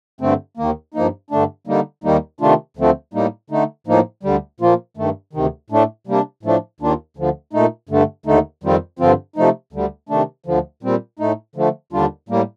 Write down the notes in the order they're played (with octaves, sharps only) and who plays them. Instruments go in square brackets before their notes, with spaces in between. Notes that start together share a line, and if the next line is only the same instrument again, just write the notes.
[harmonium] G2 D3 A3 C4
D#2 D#3 A#3
G2 F3 A#3 D#4
G2 D3 A3 D4
D3 G3 A#3 D#4
D#2 D#3 G3 A#3 D#4
C3 D#3 A3 D4 F4
D2 D3 F3 A3 C4
A2 G3 A#3 D#4
D3 A3 D#4
A2 F3 A#3 D#4
D2 D3 G3
A#2 F3 A#3 F4
G2 D#3 A3
D2 C3 D#3
A2 A3 D4
C3 G3 A#3 D4
A2 F3 A3 D4
D#2 D#3 A#3 D4 F4
D2 D3 F3
A#2 A3 D#4
G2 D3 A3
D#2 D3 A3 D#4
F2 D#3 G3 C4 F4
G2 D3 F3 C4 F4
C3 F3 A3 D#4
D2 D3 G3
C3 D#3 A3 D4
D2 D3 F3
A#2 G3 C4
A2 A3 D#4
D3 F3 A3
D#2 D3 G3 D4 F4
A2 G3 A#3